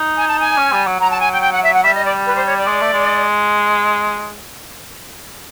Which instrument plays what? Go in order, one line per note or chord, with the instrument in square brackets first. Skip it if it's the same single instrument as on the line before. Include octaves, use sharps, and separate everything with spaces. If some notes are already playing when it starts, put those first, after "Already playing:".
Already playing: [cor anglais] D#4
[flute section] G#5
A5
G#5
[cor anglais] C#4
G3
F#3
[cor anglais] F#3 [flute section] A#5
[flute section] A5
G#5
G5
G5
F#5
E5
F#5
[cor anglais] G3 [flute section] E5
[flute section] D#5
D5
B4
C5
C#5
D5
[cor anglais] G#3
A3
G#3